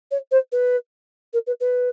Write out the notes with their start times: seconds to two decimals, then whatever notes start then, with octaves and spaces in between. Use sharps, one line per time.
0.11 C#5
0.31 C5
0.52 B4
1.33 A#4
1.46 B4
1.60 B4